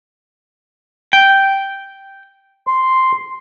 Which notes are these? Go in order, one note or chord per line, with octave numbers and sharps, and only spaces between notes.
G5
C6